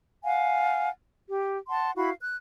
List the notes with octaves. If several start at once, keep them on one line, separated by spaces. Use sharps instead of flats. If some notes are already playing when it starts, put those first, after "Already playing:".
F5 F#5 G#5
G4
F#5 A5 C6
E4 F#4 F5 B5
F#6